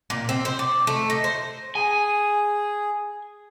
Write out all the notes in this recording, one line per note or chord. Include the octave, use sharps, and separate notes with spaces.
A#2
C4
C5
D5
A3
D#4
C5
G#4 G#5